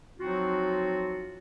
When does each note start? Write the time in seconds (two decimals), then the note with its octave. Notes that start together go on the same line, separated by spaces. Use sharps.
0.20 F3 F#3 C4 D#4 F4 F#4